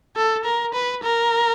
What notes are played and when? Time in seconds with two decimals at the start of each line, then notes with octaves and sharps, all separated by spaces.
0.16 A4
0.45 A#4
0.74 B4
1.03 A#4